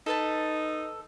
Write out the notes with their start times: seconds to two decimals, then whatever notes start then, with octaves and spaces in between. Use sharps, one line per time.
0.06 D#4 A4 B4 A5